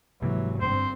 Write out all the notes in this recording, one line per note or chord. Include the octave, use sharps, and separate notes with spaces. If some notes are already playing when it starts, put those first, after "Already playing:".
F1 G#2 C3 E3 F#3 A#3
G1 G2 C4 C5